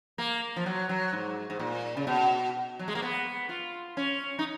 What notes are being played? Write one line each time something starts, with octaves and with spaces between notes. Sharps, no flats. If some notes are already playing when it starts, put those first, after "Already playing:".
A#3
F3
F#3
F#3
G#2
G#2
A#2
C#3
B2
F#3
G#3
A#3
B3
F4
C#4
D#4